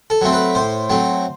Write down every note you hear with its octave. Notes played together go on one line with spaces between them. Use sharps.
A4
F#3 A3 C4
B4
A2 C5
F#3 A3 C4